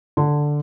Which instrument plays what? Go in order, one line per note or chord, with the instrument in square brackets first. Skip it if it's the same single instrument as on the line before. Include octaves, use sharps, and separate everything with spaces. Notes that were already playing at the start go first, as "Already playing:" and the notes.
[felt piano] D3